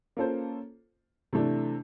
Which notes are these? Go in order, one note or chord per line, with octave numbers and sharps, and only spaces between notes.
A#3 C#4 F4 A4 C5
C3 E3 A3 D4